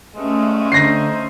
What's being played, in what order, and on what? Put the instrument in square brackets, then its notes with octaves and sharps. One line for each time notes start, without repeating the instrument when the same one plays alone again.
[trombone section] G2 G#3 [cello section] A3 C#4
[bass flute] D3 [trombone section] D#4 C5 [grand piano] A#6 C7